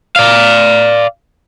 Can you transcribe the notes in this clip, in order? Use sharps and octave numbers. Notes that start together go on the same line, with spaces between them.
D5 F5